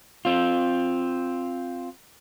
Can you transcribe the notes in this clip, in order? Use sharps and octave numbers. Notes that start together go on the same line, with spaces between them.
C4 F4